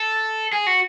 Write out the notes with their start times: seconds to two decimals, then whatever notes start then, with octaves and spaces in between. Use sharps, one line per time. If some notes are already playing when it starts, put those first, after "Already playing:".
Already playing: A4
0.53 G#4
0.67 F#4